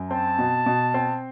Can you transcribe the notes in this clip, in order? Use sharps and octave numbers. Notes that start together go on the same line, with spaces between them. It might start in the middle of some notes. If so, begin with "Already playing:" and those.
Already playing: F#2
C4 A5
B2
B2
C4